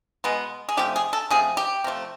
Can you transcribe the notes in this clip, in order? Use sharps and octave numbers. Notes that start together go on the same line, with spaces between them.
B2 G#3 B3
G#4
C3 F3 A3 G4
G#4
A4
C3 F3 A3 G#4
G4
C3 F3 A3